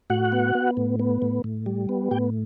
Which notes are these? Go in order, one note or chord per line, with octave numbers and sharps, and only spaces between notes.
A2 F#4 F#5
B3
B3
A2
B3
A2
A2
G3
B3
A2 G4 G5